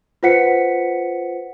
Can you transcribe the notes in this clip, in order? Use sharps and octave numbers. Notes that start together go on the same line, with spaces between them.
F4 B4 C5 F#5 B6 C#7